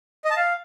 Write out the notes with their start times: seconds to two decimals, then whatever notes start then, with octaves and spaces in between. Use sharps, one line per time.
0.25 D#5
0.31 A5
0.37 F5